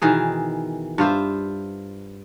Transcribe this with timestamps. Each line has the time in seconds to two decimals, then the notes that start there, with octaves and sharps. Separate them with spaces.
0.02 B2 D#3 E3 G#4
0.98 G2 F4 C5 E5